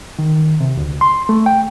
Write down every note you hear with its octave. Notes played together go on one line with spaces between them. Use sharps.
D#3
C3
D2
C6
A3
G5